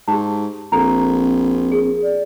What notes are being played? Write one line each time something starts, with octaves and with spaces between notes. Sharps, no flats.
G#2 G4 A5
A#1 C4 A4 A#5
G#4
D5